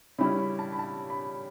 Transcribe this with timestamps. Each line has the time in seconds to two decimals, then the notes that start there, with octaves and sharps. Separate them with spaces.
0.19 C#3 G3 C#4 E4 B5
0.39 B5
0.59 A5
0.72 B5
0.79 A5
1.10 B5